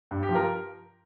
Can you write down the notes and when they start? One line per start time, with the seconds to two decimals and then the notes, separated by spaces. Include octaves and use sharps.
0.11 G2
0.23 G4
0.29 F3
0.34 F4 A#4